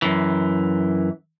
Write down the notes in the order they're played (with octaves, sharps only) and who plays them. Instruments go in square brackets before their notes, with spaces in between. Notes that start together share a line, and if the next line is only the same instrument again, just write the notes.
[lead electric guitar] F#2 E3